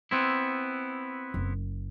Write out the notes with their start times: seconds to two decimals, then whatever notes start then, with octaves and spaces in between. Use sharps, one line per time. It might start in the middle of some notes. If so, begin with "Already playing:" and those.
0.11 B3 C4 E4
1.34 F#1